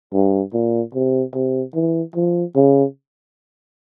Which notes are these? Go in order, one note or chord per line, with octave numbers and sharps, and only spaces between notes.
G2
A#2
C3
C3
E3
F3
C#3